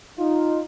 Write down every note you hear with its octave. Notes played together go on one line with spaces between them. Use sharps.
D#4 F4